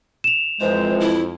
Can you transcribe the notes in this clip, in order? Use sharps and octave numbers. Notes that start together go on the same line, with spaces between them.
E7 F7
F2 E3 F3 G#3 C5
E4